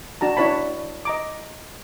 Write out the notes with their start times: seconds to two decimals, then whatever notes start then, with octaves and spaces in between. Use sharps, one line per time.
0.21 D4 F#4 A5 A#5
0.37 D4 E4 C#5 A5 B5
1.05 D#5 A#5 D6